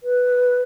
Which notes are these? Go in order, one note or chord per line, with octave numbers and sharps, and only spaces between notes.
B4